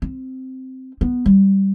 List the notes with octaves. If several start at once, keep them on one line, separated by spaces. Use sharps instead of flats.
C4
B3
G3